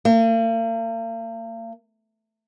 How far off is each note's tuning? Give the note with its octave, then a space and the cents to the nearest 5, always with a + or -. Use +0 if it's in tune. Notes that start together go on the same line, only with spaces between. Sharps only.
A#3 -45